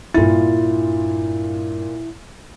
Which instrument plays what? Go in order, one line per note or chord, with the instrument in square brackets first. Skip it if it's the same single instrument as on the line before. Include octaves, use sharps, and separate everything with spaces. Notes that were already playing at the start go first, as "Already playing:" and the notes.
[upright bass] G2 D4 [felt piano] A#2 F4 A6 [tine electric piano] E4